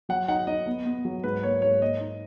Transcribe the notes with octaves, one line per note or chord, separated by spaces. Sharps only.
F#3 F#5
D#4 F#5
D#4 D#5
B3
B3
F#3
G#2 B4
A#3 C#5
G#2 C#5
A#3 D#5
D#4